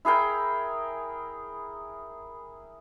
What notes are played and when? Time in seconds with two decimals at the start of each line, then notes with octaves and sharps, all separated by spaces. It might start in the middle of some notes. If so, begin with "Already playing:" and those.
0.05 E4 G#4 A#4 G5